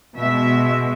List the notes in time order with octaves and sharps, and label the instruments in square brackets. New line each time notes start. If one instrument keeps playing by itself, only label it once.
[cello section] B2 G#3 E5